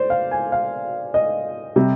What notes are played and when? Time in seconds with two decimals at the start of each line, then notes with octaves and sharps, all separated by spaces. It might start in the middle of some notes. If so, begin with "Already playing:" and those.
Already playing: C5 D5
0.10 F5
0.31 G#5
0.52 F5
1.14 D#5
1.76 C3 G3